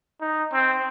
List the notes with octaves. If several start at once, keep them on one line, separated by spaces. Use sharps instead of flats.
D#4
C4